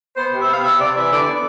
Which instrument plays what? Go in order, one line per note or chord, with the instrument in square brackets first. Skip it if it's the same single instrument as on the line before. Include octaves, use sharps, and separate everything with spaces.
[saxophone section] B3 C5
C3
E5
B3 F5
C3 E5
C3 D5
E3 E5
D3 D5
B3